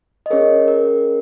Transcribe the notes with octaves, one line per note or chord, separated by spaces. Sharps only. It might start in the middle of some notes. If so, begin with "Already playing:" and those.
D#5
C#4 G#4 A#4 C#5
A#4